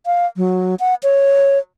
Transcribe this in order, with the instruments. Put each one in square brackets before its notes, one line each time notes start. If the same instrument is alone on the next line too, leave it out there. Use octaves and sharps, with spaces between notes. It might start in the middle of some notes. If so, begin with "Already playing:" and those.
[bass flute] F5
F#3
F#5
C#5